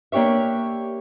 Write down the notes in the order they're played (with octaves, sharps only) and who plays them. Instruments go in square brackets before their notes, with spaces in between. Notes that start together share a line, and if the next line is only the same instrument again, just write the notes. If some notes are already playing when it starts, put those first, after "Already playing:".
[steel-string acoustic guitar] A#3 D4 G4 C#5 E5